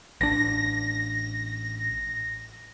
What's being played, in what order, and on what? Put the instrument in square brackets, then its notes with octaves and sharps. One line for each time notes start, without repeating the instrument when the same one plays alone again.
[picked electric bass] A1 D4 [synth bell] A#6